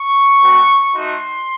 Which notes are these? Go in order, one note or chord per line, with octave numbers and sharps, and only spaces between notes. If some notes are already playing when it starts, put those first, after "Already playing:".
Already playing: C#6
A3 C4 F#4
A3 D#4 F#4 C6